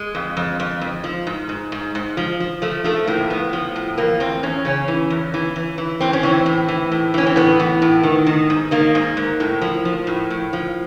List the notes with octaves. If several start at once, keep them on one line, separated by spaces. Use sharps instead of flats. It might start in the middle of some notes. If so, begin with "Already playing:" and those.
Already playing: G#3
F2
F2
F2
F2
F3
G#2
G#2
G#2
G#2
F3
F3
F3 A3
F3 A3
A2 A#3
A2 B3
F3
A2
E2 A#3
E2 C4
E2 C#4
C#3 C#4
E3
E2
E3
E3
E3
A2 C4
C#4
E3 C4
A2
E3
A2
E3 C#4
C4
A2 B3
E3
A2
D#3
D#3
G#2
D#3 A#3
G#2
G#2
A2
F3
F3
A2
A2
F3